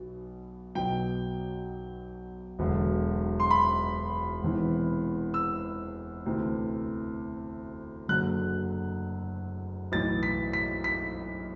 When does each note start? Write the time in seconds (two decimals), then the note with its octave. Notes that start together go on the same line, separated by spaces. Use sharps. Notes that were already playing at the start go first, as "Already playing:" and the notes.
Already playing: B1 B2
0.75 B1 B2 F#3 G5
2.59 E1 E2 D3 F#3
3.40 C6
3.51 B5
4.42 E1 E2 C3 E3
5.34 E6
6.26 D2 C3 E3
8.09 F#1 F#2 D3 F#3 F#6
9.92 B1 A2 E3 A6
10.23 B6
10.53 B6
10.84 B6